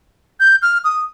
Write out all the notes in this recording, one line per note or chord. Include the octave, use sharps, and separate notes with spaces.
G6
F6
D#6